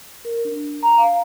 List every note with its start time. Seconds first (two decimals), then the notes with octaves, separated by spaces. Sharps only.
0.25 A#4
0.45 D4
0.83 A#5
0.98 F5